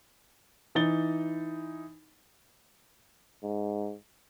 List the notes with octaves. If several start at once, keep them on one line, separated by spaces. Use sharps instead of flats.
E3 D#4 A6 G7
G#2